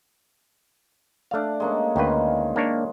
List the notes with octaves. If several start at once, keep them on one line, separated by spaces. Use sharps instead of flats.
A3 D4 D5 F5
G#3 A#3 C#4
D2 D#3 C#4 F4 B4
A#3 D4 C#5